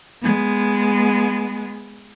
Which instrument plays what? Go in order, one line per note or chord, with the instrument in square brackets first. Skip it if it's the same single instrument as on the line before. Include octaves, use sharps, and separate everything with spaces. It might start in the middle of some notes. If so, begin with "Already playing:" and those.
[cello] G#3 B3